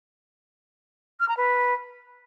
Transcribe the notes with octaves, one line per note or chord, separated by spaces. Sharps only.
F6
A#5
B4